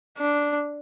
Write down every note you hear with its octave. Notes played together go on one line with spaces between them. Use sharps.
D4